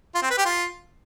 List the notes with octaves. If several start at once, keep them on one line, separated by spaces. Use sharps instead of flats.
F4
C4
B4
G4
F4